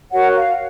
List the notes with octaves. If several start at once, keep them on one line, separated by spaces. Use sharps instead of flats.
F#4 A#4 C#5 F#5
F5